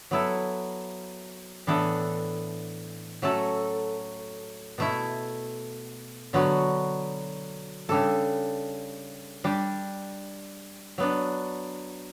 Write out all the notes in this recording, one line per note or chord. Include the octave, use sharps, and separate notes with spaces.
F#3 B3 E4 A4
A2 E3 B3 D4 A4
F#3 A3 C#4 F#4 A4
B2 A3 E4
D3 F#3 B3 F#4
C#3 G3 D4 A4
G3 D4 G4
F#3 B3 D4